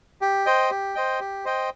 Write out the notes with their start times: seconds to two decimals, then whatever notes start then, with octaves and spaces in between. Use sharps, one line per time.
0.22 G4
0.46 C5 D#5 G5
0.70 G4
0.95 C5 D#5 G5
1.20 G4
1.45 C5 D#5 G5